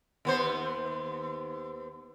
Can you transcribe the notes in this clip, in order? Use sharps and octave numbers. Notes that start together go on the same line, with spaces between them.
D#2 B3 C5